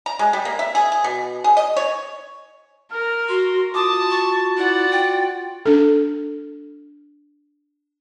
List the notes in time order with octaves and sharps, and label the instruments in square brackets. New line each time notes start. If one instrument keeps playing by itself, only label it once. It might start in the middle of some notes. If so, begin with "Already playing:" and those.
[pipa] A#5
G#3
G3
A#3
E5
G#4
G#4
B2
G#4
D#5
C#5
[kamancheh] A#4 [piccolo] F6
[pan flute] F#4 [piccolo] C6
[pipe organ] F4 F#4 [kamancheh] A5 [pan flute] D6 [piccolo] D#6
[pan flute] C#6 [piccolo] A6
[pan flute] E4 [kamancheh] D5 F#5
[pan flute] G5
[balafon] D4 A4